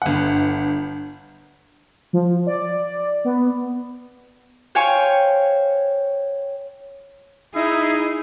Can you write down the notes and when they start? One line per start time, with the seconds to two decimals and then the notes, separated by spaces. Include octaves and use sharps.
0.02 G1 F#5
2.13 F3
2.47 D5
3.25 B3
4.75 C5 C#5 F5 G5 G#5 C#6
7.56 D#4 E4 G#4